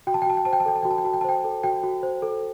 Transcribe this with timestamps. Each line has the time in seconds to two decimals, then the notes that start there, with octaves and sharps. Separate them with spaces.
0.07 F#4 G5
0.14 A5
0.22 G5
0.26 F#4 A5
0.37 G5
0.45 C5 A5
0.53 G5
0.60 A5
0.66 A4 G5
0.76 A5
0.83 F#4 G5
0.91 A5
0.98 G5
1.05 F#4 A5
1.13 G5
1.21 A5
1.24 C5 G5
1.44 A4
1.64 F#4 G5
1.83 F#4
2.03 C5
2.22 A4